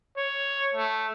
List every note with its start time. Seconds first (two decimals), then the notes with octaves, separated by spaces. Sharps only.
0.17 C#5
0.75 A3